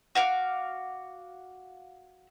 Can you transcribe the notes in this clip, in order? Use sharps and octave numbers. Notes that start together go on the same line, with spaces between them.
F#4 F5 D6